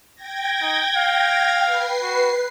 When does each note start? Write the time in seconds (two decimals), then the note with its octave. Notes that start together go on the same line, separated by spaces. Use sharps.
0.15 G5 G#6 A#6
0.62 D#4
0.97 F5
1.65 B4 C7
2.03 F#4